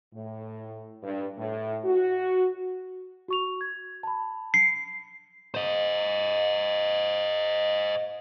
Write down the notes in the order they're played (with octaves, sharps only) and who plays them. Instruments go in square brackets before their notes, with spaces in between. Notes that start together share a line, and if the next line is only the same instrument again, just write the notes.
[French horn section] A2
G2
A2
F#4
[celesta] F#4 C#6 F7
G#6
A5 B5
[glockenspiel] C7 [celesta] C#7
[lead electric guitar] C5 D#5